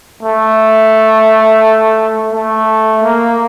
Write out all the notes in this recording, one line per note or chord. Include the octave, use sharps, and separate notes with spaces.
A3
A3
A#3